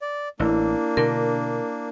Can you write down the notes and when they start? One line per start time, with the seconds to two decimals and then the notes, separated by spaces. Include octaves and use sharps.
0.02 D5
0.40 A1 A#3 D4 E4
0.97 B2 D3 A#4